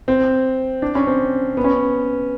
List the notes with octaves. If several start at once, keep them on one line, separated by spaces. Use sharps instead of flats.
C4
D4
C#4
C4
B3
C#4